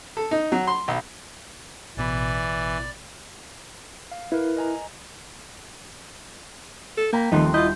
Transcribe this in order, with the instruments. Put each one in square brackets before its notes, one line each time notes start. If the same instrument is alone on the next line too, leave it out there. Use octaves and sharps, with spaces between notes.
[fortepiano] A4
D#4
F#3
C6
B1
[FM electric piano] A1 B2 B5 [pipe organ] E3 [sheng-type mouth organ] D5
[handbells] F5
[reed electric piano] E4 [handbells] A#4 B4
[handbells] D#5 G#5 A#5
[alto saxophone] A4
[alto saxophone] A#3 [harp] G5 A#5 B5
[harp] D#1 F#5 C6 [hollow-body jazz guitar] F3 A3 C4 [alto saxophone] D#4
[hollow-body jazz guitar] E4 F4 [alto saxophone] D#5 [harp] G6